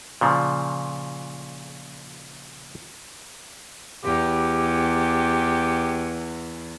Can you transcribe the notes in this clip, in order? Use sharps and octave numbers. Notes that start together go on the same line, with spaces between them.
A#2 C#3 F3
E2 G4